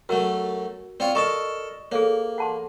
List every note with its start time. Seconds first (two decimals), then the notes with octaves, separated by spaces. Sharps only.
0.09 F#2 F#3 A3 F#4 A#4 E6
1.00 C4 F4 C#5 D5
1.15 A4 A#4 D#5 A5 C#6 D#6
1.92 A#3 G#4 A4 C#5
2.38 F#5 A5 C6